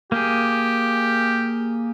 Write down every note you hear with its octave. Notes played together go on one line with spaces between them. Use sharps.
A#3 G4 G#4